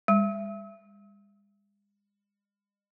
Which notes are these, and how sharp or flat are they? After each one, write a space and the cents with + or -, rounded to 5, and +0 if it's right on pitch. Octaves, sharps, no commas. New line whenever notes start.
G#3 -45